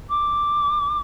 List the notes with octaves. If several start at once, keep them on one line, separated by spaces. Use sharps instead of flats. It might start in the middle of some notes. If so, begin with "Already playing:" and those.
D6